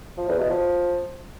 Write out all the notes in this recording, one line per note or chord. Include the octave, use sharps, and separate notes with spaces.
F3
E2
B2
F3